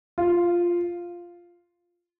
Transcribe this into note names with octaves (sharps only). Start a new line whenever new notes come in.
F4